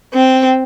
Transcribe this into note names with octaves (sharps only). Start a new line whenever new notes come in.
C4